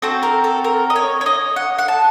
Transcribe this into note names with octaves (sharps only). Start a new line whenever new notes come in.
C4 F#4 A4 C5
A#4
A4
A#4
D#5
C#5
C#5
D#5
F#5
F#5
A5